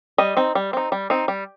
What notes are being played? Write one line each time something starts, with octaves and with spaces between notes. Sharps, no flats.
G3 D#5
C4 D#4
G3
C4 D#4
G3
C4 D#4
G3